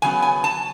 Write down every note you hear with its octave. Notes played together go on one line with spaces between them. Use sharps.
C#3 F#3 B3 G#5
G#5
A5